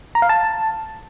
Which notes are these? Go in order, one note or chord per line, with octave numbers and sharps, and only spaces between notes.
A#5
F5
A5